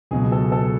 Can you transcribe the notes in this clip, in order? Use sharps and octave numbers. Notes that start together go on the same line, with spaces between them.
C#2 B2 F#3 G#4
A4
A4